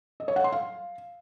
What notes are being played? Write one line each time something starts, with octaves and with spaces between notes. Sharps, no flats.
D#5
C#5
F#5
C6
F5